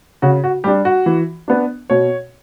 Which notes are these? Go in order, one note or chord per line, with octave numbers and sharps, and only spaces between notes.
C#3 F#4
F#4
G3 D4 G4
F#4
E3
B3 D4
B2 C#5